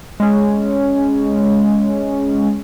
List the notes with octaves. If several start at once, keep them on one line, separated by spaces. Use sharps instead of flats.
G#3 C#4